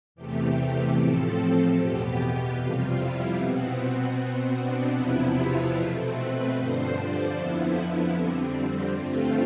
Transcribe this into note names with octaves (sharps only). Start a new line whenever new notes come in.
E2 C3 E3 A3 G4
G4
A2 F3 C4 A4
E2 B2 B3 G4
F2 C3 G3 F4
E4
B2 B3 C4
B2 B3 C4
D4
E2 C3 F3 B3 E4
F4
B2 A3 C4
B4
G2 D3 F3 C5
D5
F2 D3 F3 B3 E4
F2 D3 G3 C4
C4
G2 D3 A3 C4 F4